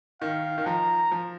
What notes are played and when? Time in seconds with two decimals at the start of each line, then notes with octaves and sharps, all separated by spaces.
0.21 D#3 F5
0.58 D#3
0.66 F3 A#5
1.11 F3